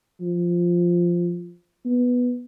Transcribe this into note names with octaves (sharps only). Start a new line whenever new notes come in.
F3
B3